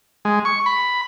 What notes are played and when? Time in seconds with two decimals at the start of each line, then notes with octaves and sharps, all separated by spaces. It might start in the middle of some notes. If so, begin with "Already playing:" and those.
0.25 G#3
0.45 C#6
0.66 B5